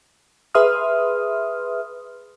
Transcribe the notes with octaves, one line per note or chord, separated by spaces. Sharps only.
G#4 B4 E5 C6 D#6 F6